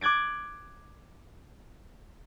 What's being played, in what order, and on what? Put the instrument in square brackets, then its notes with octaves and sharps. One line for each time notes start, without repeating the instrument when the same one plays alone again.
[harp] D6 F#6 G#6 A6 D7